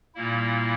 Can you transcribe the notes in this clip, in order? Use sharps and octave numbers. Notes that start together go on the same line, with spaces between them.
A#2 G3 A#3 E4